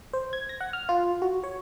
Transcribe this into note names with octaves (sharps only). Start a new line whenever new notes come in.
C5
G#6
A#6
F#5
F6
F4
F#4
C#5